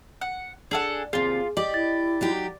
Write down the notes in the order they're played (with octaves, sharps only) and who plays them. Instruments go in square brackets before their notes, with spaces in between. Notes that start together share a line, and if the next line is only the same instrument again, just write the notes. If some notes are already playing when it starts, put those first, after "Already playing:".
[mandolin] F#5
[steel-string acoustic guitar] D4 [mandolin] G#4 A4 F#5
[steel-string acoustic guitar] D#2 C3 [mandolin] F4 [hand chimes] G#4
[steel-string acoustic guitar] G4 [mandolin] D5 [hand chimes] D#5
[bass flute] E4 [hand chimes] A6
[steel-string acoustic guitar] F#3 D#4 G4